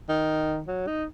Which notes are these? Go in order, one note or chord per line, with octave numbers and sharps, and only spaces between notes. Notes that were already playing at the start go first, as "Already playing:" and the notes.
D#3
F#3
D#4